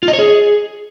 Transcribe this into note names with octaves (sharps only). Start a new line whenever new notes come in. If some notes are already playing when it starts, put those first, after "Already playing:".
F4
D#5
C#5
G#4